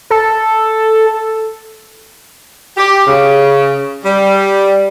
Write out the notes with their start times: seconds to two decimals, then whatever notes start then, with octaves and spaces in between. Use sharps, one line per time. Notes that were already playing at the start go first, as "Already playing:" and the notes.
0.11 A4
2.77 G4
3.07 C#3
4.05 G3